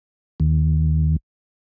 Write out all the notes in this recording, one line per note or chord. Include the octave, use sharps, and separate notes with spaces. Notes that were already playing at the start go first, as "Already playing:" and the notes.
D#2